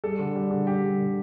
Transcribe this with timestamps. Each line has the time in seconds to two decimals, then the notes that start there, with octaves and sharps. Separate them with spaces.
0.04 G3 A4
0.19 D3
0.35 G3
0.51 D3
0.67 G3 G4
0.83 G3
0.99 D3